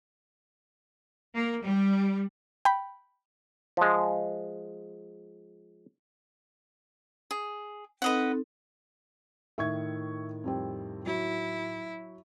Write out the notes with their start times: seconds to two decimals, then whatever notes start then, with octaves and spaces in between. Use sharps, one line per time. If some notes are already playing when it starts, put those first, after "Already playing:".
1.35 A#3
1.65 G3
2.65 G5 B5
3.77 F3 G#3
7.31 G#4
8.02 C4 D#4 A4 B4 D#5 F#5
9.58 A2 D#3 E5 C#6 G#6
10.44 F2 G3 C4
11.06 F#3 E4